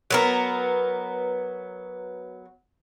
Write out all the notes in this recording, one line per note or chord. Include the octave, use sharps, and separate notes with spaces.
F#3 B3 A#4